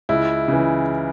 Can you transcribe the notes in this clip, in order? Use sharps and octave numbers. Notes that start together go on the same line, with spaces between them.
C#2 E4
C#3 E3